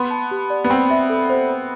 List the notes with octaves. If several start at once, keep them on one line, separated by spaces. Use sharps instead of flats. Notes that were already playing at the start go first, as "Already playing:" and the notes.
Already playing: B3 C6
A5
G4
D5
B3
C4 B5
E5
A4
C5
B5